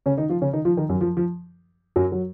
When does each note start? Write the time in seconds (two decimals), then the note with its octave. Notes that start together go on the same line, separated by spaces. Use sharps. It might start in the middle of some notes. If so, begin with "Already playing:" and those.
0.06 C#3 C#4
0.17 D#3 D#4
0.29 F3 F4
0.42 C#3 C#4
0.53 D#3 D#4
0.65 F3 F4
0.77 D#3 D#4
0.89 F#2 F#3
1.01 F3
1.17 F3
1.96 F#2 F#3
2.12 F#3